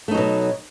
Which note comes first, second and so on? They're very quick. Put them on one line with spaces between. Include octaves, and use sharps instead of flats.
A3 D#4 F#3 B2